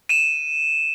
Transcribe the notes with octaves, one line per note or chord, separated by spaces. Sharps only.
D#7 E7